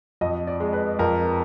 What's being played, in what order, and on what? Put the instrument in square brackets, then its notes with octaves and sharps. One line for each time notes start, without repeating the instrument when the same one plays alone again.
[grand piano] F2 D#5
D5
G#3
B4
F2 A#4